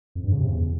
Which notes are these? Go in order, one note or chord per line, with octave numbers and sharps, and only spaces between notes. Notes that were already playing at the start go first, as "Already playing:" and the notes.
F2
G2
C#3
C3
E2